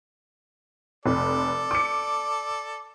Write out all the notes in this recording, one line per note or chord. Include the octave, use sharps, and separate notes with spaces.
F1 A4 D5
D6 C#7